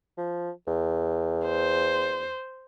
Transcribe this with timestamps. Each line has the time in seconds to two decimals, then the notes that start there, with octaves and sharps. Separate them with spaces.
0.18 F3
0.67 E2
1.47 C5